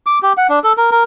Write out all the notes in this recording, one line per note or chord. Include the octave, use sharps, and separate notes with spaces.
D6
G4
F#5
D4
A4
A#4
A#4